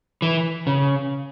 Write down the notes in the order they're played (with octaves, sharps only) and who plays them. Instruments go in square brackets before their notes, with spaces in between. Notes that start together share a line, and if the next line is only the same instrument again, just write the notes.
[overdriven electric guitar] E3
C#3